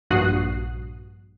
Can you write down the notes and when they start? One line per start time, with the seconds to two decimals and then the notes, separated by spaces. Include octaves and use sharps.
0.10 A#1 G2 F#4 D#6 F#6 C7